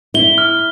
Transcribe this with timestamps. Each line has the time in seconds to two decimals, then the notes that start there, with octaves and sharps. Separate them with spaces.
0.14 E4 G7
0.38 F6